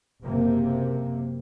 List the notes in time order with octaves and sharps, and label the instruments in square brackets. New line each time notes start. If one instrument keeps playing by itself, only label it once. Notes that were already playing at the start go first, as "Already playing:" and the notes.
[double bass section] F#1 C3 A#3